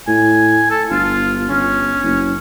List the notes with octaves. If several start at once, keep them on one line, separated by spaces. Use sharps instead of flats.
A2 G#5
A4
G1 F4
G1 C#4
F#1